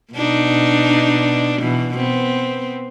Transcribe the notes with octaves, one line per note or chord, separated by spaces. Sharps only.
B2 D4 D#4
B2 E3
B3 C4